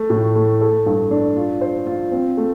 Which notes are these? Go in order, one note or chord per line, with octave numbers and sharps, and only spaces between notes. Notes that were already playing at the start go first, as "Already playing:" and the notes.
Already playing: A3
A2
A3
A4
G2
D4
F4
C5
F4
C4
A3